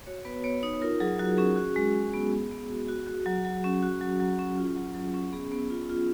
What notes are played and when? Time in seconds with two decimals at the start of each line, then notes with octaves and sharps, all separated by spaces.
0.06 F#4 C#5
0.25 B3 B4
0.44 B3 C#5
0.63 D#4 C#5
0.81 F4 A#4
1.00 F#3 G#4
1.19 F#3 F#4
1.38 C#4 G#4
1.56 F#4
1.76 G#3
1.94 G#3
2.14 B3
2.32 B3 G#4
2.51 B3
2.70 F#4
2.88 F#4
3.07 F#4
3.26 F#3
3.45 F#3
3.64 C#4
3.82 F#4
4.01 F#3
4.20 F#3
4.39 C#4
4.58 F4
4.76 F#3
4.95 F#3
5.14 C#4
5.32 B3 G#4
5.52 B3
5.70 F4
5.90 F4